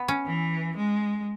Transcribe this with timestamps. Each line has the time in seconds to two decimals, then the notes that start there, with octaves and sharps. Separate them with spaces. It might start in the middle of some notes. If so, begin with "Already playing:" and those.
Already playing: B3
0.08 C#4
0.26 E3
0.77 G#3